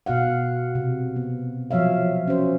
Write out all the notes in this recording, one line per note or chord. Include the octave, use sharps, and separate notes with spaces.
B2 F#4 F5 F#5
C3
B3
F3 F#3 C#5 E5 F5
C#4 F#4 C5